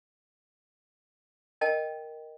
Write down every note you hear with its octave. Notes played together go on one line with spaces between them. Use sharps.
A#4 D#5 G5 A5